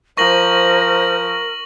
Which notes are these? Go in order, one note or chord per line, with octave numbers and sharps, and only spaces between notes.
F3 A#4 C5 C#6 A#6 F#7